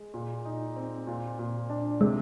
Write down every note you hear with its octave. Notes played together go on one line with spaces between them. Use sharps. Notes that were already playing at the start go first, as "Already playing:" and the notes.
Already playing: G#3
A#2
D#4
C4
A#2
A#2
D4
C3 G#3